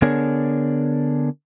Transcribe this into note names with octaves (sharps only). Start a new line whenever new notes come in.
D3 B3 D4 G#4 A#4 C#5